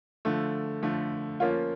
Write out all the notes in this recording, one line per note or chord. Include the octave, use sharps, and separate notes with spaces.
D3 F3 A3
D3 F3 A3
F3 A#3 C#4 F4